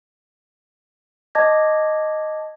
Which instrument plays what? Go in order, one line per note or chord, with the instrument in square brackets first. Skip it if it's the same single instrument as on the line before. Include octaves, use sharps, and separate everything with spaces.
[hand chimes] D#5 A5 D6 G#6 A#6